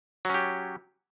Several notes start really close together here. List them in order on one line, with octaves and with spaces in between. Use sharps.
F#3 C#4 G4